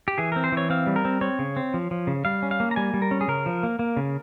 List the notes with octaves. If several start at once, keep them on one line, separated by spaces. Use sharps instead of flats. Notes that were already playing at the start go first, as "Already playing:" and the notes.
G4
E3 G#4
C4 A#4
C5
E3 C#5
C4 F5
G3
A#4
C4
C4 C#5
C#3
C4
F3
F3
C#3
G3 F5
C#4
F5
A#3
A#5
G3 G#5
G3
A#4
C#4
G#4
C#3 A#4
F3
A#3
A#3
C#3